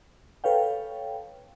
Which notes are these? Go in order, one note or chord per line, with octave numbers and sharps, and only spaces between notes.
A4 B4 C#5 F5 G5